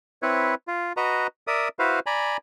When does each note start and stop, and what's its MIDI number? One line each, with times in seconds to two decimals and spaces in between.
0.22 0.55 60
0.22 0.55 64
0.22 0.55 71
0.22 0.55 73
0.67 0.93 65
0.97 1.27 66
0.97 1.27 71
0.97 1.27 75
0.97 1.27 82
1.47 1.69 70
1.47 1.69 74
1.47 1.69 76
1.47 1.69 87
1.79 2.00 64
1.79 2.00 66
1.79 2.00 71
1.79 2.00 72
1.79 2.00 77
2.06 2.37 74
2.06 2.37 80
2.06 2.37 82
2.06 2.37 83